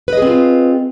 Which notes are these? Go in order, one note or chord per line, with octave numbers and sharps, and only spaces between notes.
C4 F4 G#4 B4 D#5